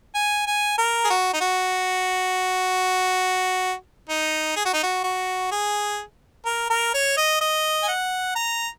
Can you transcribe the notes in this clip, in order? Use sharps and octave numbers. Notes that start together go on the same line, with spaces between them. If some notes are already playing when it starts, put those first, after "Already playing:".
G#5
G#5
A#4
G#4
F#4
D#4
F#4
D#4
G#4
F#4
D#4
F#4
F#4
G#4
A#4
A#4
C#5
D#5
D#5
G#5
F#5
A#5